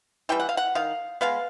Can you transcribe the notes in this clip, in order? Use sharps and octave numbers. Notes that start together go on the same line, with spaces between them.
E3 G3 G5
F#5
F5
F#5
D#3 F5
G#3 B3 F5